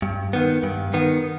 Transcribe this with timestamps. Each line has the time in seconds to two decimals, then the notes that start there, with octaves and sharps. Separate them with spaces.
0.02 G2
0.33 D#3 B3
0.63 G2
0.94 D#3 B3